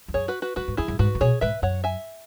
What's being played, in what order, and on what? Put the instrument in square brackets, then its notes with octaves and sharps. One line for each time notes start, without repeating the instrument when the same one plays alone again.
[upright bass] E2
[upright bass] F#2 [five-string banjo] G#4 C#5
[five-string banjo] F#4 B4
F#4 B4
[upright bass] G#2 [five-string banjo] F#4 B4
[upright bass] G#2
[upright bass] E2 [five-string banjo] E4 G#4
[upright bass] F#2
[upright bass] G#2 [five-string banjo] F#4 B4
[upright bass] C#3
[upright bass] B2 [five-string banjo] G#4 C#5
[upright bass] G#2 [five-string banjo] B4 E5
[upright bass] F#2 [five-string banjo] C#5 F#5
[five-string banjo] E5 G#5